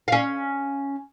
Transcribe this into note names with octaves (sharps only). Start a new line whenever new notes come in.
C#4 F5